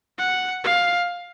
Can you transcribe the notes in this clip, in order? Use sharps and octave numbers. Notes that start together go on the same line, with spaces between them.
F#5
F5